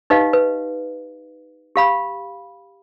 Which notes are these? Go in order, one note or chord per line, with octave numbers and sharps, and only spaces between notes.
D#4 G4 B4 D#5 F5
B4
G4 F5 B5